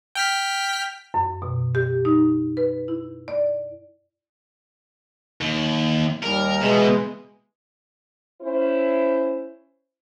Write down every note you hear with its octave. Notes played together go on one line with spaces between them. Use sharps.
G5 F6 B6
F#2
B2
G4
D#4
B4
E4
D5
D#2
D#2 G3 A#4
B2 E3 G#3
C#4 E4 C5